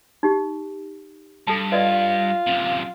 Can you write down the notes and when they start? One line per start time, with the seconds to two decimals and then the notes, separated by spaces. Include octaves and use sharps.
0.23 D#4 G4
1.47 G2 A4 A5
1.72 F4 B4 D5 D#5
2.47 F#2 C3